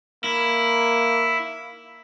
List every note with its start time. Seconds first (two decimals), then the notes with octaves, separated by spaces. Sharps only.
0.24 A#3 E4